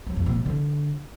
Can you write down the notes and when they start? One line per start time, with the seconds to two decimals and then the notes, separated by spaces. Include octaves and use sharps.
0.07 F#3
0.16 F2
0.26 A#2
0.36 C#3
0.46 D3